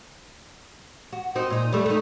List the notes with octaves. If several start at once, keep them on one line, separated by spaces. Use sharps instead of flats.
F#4
C4 D#4 F#4
A#2 D#4
G3 A3 D4
A3 D#4